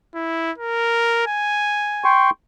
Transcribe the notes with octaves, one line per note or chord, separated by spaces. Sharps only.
E4
A#4
G#5
G5 C6 C#6